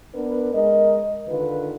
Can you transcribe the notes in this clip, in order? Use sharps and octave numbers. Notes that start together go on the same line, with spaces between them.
B3 D4 A#4 B4
G#3 A#4 D#5
D3 D#3 F4 B4